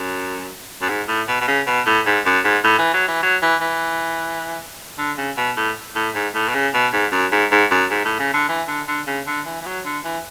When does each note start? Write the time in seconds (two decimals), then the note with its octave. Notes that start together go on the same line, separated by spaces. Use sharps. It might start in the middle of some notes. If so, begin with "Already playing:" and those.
Already playing: F#2
0.82 F#2
0.89 G#2
1.08 A2
1.28 B2
1.41 B2
1.48 C#3
1.67 B2
1.86 A2
2.06 G#2
2.25 F#2
2.44 G#2
2.64 A2
2.79 E3
2.94 F#3
3.08 E3
3.23 F#3
3.42 E3
3.61 E3
4.98 D3
5.17 C#3
5.37 B2
5.57 A2
5.96 A2
6.15 G#2
6.35 A2
6.49 B2
6.54 C#3
6.74 B2
6.93 G#2
7.12 F#2
7.32 G#2
7.52 G#2
7.71 F#2
7.91 G#2
8.05 A2
8.20 C#3
8.34 D3
8.49 E3
8.68 D3
8.88 D3
9.07 C#3
9.27 D3
9.46 E3
9.61 E3
9.66 F#3
9.85 D3
10.04 E3